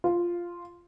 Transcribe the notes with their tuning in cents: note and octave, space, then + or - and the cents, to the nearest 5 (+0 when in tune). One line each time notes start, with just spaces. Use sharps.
F4 -5